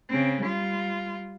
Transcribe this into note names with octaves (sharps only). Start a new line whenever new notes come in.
C#3 C4
G3 F4